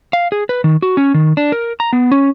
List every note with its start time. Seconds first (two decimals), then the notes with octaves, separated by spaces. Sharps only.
0.13 F5
0.32 G#4
0.49 B4
0.64 D#3
0.82 F#4
0.97 C#4
1.14 D#3
1.37 D4
1.52 A#4
1.80 A#5
1.93 B3
2.12 C#4